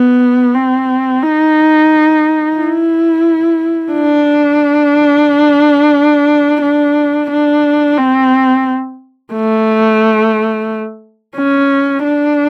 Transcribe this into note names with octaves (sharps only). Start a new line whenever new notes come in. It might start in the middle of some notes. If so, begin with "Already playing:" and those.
Already playing: B3
C4
D#4
E4
D4
D4
D4
C4
A3
C#4
D4